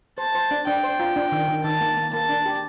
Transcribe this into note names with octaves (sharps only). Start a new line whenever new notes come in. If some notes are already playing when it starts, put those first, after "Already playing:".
C5 A5
C5
D4
D4 G5
C5
F4
D4
D#3
D#3
D#3 A5
A#3
A#3
A#3 A5
D4
G4